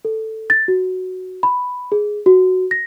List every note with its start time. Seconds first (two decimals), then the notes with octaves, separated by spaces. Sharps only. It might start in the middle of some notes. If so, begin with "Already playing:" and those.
0.05 A4
0.50 A6
0.68 F#4
1.43 B5
1.92 G#4
2.26 F#4
2.71 A#6